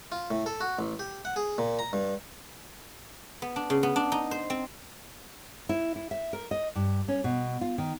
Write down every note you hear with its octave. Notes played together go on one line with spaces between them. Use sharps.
F4
A2
A4
F#4
A1
G4
F#5
G#4
A#2
A#5
G2
B3
D4
C#3
B3
D4
D#4
C5
C4
E4
E4
E5
A#4
D#5
G2
C#4
B2
F4
D#3